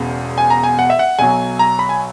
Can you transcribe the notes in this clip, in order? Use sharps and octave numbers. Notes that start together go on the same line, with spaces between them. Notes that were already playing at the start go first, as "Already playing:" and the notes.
Already playing: E1 E2 C#3
G#5
A#5
G#5
F#5
E5
F#5
B1 B2 F#3 G#5
A#5
B5
G#5